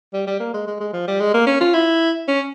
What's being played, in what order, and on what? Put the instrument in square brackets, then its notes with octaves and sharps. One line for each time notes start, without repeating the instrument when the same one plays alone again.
[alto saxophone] G3
G3
A#3
G#3
G#3
G#3
F3
G3
G#3
A#3
C#4
F4
E4
C#4